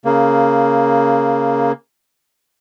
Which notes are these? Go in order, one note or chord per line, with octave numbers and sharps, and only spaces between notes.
C#3 A#3